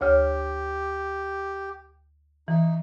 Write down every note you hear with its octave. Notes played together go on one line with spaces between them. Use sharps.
D2 G4 C#5 F6
E3 D#4